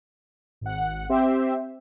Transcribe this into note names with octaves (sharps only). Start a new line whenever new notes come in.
G#1 F#5
C4 G4 C5 E5